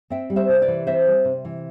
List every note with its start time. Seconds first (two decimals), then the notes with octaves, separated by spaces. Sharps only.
0.10 C4 E5 G5
0.30 G3
0.36 C5 E5
0.49 C3
0.62 B4 D5
0.68 E3
0.87 C4 C5 E5
1.06 G3
1.25 C3
1.45 E3